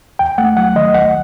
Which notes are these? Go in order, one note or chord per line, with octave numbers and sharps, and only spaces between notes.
D#2 G5
A3 F#5
F#3 F#5
D#3 D#5
C2 F#5